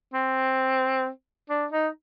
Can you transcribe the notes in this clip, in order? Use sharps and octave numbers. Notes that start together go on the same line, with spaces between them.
C4
D4
D#4